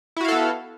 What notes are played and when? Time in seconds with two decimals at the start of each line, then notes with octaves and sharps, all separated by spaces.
0.16 E4
0.20 F#4
0.24 F5
0.28 A4
0.32 B3